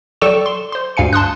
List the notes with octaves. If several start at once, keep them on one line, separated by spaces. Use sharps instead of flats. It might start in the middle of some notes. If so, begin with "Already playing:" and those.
F#3 A4 D5 G5 C#6 E7
C6
C5 C6
D2 G2 F5 G#5 C#7
A5 C6 D#6 F#6